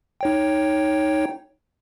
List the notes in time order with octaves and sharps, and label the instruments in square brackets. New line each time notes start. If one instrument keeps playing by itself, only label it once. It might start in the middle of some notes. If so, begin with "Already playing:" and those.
[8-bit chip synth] D#4 C#5 G5